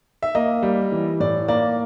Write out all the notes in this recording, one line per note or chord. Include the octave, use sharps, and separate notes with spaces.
E5
A#3 D#5
G3
E3
A2 D5
A#3 D5